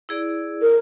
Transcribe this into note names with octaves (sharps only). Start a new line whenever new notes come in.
E4 G#4 D5
A#4